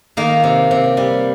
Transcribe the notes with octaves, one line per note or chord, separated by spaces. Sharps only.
D#3 A#3
C3
C3
G3